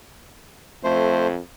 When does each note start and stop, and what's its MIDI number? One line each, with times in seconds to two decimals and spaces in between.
0.84 1.39 41
0.84 1.27 57
0.84 1.27 72